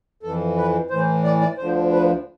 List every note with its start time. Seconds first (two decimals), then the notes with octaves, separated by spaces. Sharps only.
0.23 F2 E3 A4
0.57 B4
0.90 A2 E3 C5
1.24 D5
1.41 D5
1.57 D2 D3 F3 C5
1.92 B4